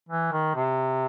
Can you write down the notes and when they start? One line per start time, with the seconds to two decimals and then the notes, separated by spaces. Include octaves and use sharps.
0.09 E3
0.32 D#3
0.55 C3